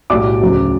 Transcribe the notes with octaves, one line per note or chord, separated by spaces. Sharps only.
B1 A2 G3 D5 D6
D2 C#3 F#3